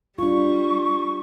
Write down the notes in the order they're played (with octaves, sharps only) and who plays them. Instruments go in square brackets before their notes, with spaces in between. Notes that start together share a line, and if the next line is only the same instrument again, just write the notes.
[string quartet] G3 [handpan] D4 F4 [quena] C#6